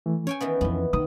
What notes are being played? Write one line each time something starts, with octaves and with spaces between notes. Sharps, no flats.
E3 A3
C#4 C#5 G5 G#5
D#3 E3 B3
F2 E3 B3
D#3 D#6